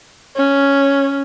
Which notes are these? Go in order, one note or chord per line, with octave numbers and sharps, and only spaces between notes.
C#4